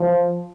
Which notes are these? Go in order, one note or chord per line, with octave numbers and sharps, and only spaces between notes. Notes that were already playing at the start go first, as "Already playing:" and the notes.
Already playing: F3